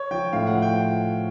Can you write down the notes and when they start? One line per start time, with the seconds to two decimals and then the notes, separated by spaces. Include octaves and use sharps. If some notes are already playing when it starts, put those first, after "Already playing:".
Already playing: C#5
0.11 F3 G5
0.33 A2 F5
0.47 F#5
0.54 F3
0.62 G5